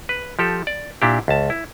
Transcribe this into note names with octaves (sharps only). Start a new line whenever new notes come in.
B4
F3 G4 A4
D5
A#2 D4 E4 G4
C#2 A5
E4